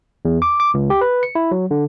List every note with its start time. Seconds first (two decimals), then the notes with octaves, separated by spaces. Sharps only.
0.25 E2
0.42 D6
0.60 D6
0.74 C#2
0.90 G4
1.01 B4
1.23 C#7
1.35 E4
1.51 F#3
1.71 D3